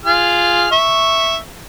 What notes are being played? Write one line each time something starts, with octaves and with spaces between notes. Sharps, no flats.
F4 G#4 F6
E5 C#6